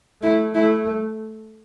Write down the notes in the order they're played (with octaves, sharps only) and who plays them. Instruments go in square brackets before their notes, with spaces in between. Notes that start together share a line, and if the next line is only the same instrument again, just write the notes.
[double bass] A3 [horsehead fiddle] E4
[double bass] A3 [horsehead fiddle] E4